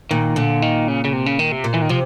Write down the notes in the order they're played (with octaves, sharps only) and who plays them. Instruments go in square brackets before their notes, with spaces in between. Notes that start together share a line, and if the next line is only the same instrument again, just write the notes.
[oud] A#2 [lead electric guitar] D#3
[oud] A#2 [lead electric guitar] D3
[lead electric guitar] D#3
C#3
C#3
C3
C#3
D#3
C3
[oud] A#2
[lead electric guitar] E3
D#3
[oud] C3 [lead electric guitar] F3